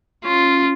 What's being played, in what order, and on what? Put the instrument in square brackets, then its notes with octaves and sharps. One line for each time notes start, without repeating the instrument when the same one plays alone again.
[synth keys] C#4 [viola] F4